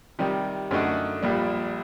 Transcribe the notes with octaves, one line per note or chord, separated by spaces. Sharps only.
C3 D#3 G3
F#2 D3 A3 D#4 F#4
A#1 A#2 G3